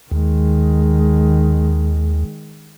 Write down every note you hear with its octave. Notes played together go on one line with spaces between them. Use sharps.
D#2 D#3 G#3